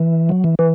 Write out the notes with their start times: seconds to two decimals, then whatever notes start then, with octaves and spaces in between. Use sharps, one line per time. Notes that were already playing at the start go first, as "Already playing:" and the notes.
Already playing: E3
0.29 F#3
0.44 E3
0.59 E3